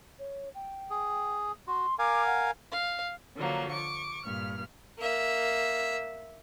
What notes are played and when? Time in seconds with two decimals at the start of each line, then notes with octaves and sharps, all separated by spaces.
0.19 C#5
0.55 G5
0.90 G#4
1.67 F#4 C6
1.99 A#4 F5 G#5 D6
2.26 F#5
2.72 F5
3.37 D3 F3 F#3 A#3
3.71 C#6 D6
4.24 G2 A#2 F6
4.99 A#3 E5